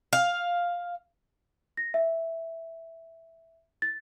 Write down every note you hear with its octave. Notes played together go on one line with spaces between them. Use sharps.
F5
A#6
E5
A6